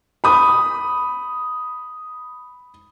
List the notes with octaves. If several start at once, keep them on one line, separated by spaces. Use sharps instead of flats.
B5 D#6